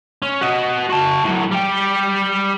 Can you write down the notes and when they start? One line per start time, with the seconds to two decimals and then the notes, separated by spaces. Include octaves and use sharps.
0.22 C#4
0.41 F#4 D#5
0.90 F#4 A5
1.24 A2 F#3
1.51 G3 G5